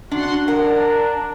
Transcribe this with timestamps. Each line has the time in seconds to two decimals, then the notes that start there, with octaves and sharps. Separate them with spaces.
0.11 D4 F#4 F#5 C6
0.48 D4 A#4 F#5